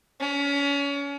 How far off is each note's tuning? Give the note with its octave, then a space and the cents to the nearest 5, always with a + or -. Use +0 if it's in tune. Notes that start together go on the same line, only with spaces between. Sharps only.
C#4 +30